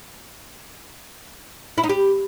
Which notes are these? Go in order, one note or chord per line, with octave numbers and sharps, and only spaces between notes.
E4
D#4
G4